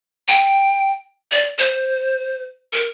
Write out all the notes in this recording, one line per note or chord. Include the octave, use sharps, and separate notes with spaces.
G5
D5
C5
A#4